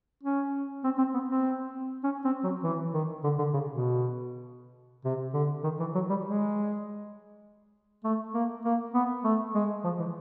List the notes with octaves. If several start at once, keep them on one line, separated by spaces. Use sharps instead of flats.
C#4
C4
C4
B3
C4
C#4
C4
F#3
E3
D#3
D3
D3
C#3
B2
C3
D3
D#3
E3
F#3
G3
G#3
A3
A#3
A#3
B3
A3
G#3
F3
E3